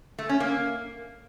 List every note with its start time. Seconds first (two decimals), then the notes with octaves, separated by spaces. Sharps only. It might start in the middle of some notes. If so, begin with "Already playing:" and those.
0.18 A3
0.29 C#4
0.40 A#3